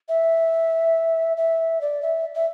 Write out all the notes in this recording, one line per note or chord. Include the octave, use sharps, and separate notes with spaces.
E5
E5
D5
E5
E5